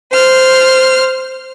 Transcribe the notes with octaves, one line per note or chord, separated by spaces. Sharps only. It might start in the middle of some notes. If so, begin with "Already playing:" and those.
C5 F6